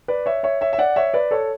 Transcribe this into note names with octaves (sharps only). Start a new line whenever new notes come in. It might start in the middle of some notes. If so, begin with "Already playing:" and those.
B4 D5
C#5 E5
C#5 E5
C#5 E5
E5
D5 F#5
C#5 E5
B4 D5
A4 C#5